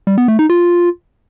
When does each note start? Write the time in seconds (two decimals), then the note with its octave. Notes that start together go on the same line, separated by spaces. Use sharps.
0.07 G3
0.18 B3
0.28 A3
0.39 D#4
0.49 F4